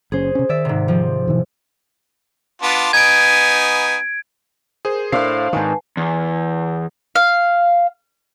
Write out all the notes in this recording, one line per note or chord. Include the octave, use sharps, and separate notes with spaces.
F#1 C#4 G#4 C5
C3 C#4
D#3 D5 E5
G#2 C3
F3 C4
B2 D#3 E3
B3 D4 F4
B3 D#4 G#5 G#6 D7
G#4 A#4 C5
A2 D4 C5 F5 C7
G#2 D#3 B4 G#5 A5
E2
F5